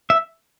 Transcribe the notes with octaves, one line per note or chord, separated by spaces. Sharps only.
E5